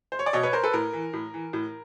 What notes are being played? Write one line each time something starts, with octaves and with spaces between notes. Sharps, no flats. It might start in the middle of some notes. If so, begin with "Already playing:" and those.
C5
C#5
D5
B2 C#5 D#5
B4 C#5
A#4 C5
A4 B4
A2 A#4
E3
A2
E3
A2